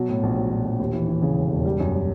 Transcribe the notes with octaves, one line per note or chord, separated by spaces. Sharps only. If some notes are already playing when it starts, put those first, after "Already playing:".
Already playing: B2 F#3
A2
A#1
F#3
A#1
A#1
D#2
E3
E3
C#3
E1
E1
G3
F#2
G3